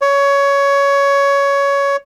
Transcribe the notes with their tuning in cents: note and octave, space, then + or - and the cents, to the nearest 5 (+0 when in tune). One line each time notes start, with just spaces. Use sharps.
C#5 +15